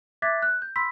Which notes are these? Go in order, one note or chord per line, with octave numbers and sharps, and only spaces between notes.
E5 D6 F#6 G#6 A6 B6
F#6
G6
B5 C6 E6 B6